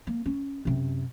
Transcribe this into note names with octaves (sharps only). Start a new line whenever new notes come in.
A#3
C#4
F#2 C3